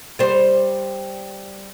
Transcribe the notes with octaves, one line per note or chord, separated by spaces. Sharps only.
G3 C5